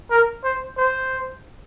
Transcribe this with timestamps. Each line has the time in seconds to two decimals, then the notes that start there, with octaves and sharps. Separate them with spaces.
0.11 A#4
0.44 C5
0.77 C5